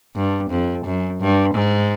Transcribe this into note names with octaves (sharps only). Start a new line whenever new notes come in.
G2
F2
F#2
G2
G#2